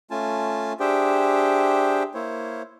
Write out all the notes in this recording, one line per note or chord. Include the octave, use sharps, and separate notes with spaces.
A3 C#4 F4 G#5 A5
D4 G4 G#4 C5 E5 G5
A#3 E4 C5 C#5